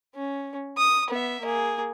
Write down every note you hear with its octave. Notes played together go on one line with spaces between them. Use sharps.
C#4
D#6
B3 E5
A#3 G#4